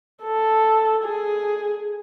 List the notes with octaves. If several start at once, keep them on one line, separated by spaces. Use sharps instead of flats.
A4
G#4